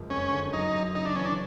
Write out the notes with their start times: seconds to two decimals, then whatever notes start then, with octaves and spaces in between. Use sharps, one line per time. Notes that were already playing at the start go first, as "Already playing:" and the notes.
Already playing: F#1 F3 G#3
0.10 F2 C#4
0.32 D3
0.53 F#2 D#4
0.74 F#2
0.95 C#3 D#4
1.05 D4
1.15 E3 C#4
1.26 D4